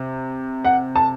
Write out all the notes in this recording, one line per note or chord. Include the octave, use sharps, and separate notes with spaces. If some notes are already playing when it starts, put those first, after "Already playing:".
Already playing: C3
F#5
A5